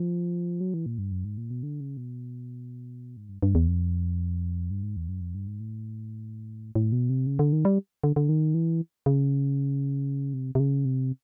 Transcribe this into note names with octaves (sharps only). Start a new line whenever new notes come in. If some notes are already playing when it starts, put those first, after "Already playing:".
Already playing: F3
F#3
E3
A#2
G2
F#2
G#2
A#2
B2
D3
C#3
B2
G#2
G2
G2
E2
F2
G2
G#2
E2
F#2
F2
G2
G#2
A2
A2
B2
C3
C#3
D3
D#3
G3
D3
D3
D#3
E3
C#3
C3
C3
C#3
C3